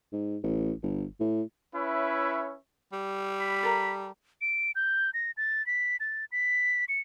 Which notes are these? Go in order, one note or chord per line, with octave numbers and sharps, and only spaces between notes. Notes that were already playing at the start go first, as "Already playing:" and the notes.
G#2
A1
G1
A2
C#4 E4 B4 C#5 E5
G3
B5
A4 A#4 A#5
D7
G6
A#6
A6
B6
A6
B6
C#7